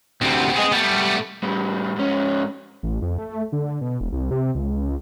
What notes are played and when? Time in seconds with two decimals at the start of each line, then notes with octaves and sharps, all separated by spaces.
0.22 D2 C3 B3 C4
0.57 G#4 D#5
0.72 G3 A3 B3
1.43 A2 G3
1.96 G#2 C#4
2.83 A1
3.02 F2
3.18 A3
3.52 D3
3.81 B2
4.01 E1
4.12 C2
4.31 C3
4.55 C#2